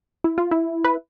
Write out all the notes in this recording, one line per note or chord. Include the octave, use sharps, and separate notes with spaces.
E4
F4
E4
B4